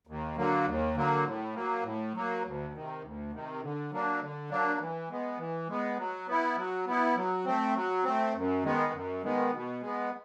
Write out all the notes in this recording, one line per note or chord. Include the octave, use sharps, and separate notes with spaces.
D#2
D3 F#3 A#3
D#2
D3 F#3 A#3
A2
F#3 A#3
A2
F#3 A#3
D2
C3 D#3
D2
C3 D#3
D3
F#3 A#3 D4
D3
F#3 A#3 D4
E3
G#3 B3
E3
G#3 B3
F#3
B3 E4
F#3
B3 E4
F#3
A3 C4
F#3
A3 C4
F#2
D#3 G#3 B3
F#2
D#3 G#3 B3
B2
G#3 B3